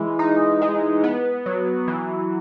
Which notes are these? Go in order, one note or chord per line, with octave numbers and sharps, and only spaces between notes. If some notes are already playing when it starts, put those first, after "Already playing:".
Already playing: E3 G#3
D#4
G#3
B3
F#3
E3